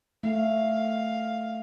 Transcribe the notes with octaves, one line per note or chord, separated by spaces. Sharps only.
A3 F5